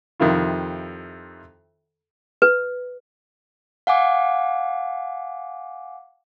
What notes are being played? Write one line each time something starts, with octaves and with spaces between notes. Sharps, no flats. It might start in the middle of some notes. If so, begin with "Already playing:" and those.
F2 C3 D#3 E4 F4
B4
F5 F#5 G#5 D6